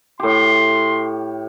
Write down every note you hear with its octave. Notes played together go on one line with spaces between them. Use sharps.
A2 G4 C6